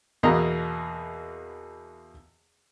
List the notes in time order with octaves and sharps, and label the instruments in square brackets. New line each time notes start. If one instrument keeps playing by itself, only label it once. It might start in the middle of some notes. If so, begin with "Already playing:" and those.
[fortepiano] E2 B2 A#3 D#5 A#5